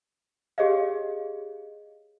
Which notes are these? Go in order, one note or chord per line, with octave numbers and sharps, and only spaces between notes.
G4 G#4 C#5 D#5 F5